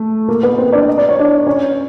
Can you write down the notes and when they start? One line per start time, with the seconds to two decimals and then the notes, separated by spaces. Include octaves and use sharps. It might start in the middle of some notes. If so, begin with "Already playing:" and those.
Already playing: A3 A4
0.28 A#3 A#4
0.43 B3 B4
0.53 B4
0.58 C4 C5
0.73 D4 D5
0.88 D#5
0.98 D5
1.09 C#5
1.19 D4 D5
1.47 C#4 C#5